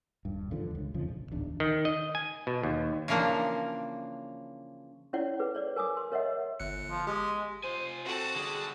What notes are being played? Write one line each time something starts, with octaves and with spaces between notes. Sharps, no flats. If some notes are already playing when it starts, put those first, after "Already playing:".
D#1 G2
G#1 E2 D3 F3
C#2
E1 F2 C#3 F3
A#1
D1 E2 D4
D#3
D#5
G#5
B2
D#2
C#3 E3 F3 A#3 D4
C#4 E4 C#5 D5 F#5
G#4 B4
C#5 D5
A#4 G#5 D6 D#6
C6
A#4 C#5 D#5 E5 F#5
G1 F#6 C#7
F3
G#3 G4
F4 C5 G#5
C4 F#4 A4 C5 A5
D3 G3 G#4